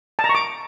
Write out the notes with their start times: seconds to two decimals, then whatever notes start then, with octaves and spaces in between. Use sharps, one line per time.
0.19 A5
0.24 A#5
0.29 C#6
0.35 D6